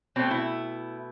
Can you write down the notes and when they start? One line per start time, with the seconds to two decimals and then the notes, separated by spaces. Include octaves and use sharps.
0.16 B2 A3 C4
0.31 E4